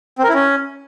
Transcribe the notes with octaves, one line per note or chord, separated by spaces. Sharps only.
C4
A#4
E4
C#4